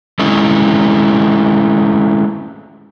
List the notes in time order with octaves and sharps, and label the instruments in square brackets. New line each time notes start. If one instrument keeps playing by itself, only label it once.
[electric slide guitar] G#3 A3 C#4 E4